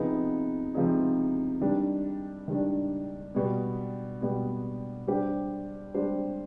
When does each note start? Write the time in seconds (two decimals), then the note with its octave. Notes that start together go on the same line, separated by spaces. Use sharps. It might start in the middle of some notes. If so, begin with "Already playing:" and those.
Already playing: C3 F3 B3 D#4 G#4
0.74 C3 F3 B3 D#4 G#4
1.61 D#3 G3 D4
2.48 D#3 G3 D4
3.35 B2 G3 B3
4.21 B2 G3 B3
5.08 G3 D4 G4 C5
5.94 G3 D4 G4 C5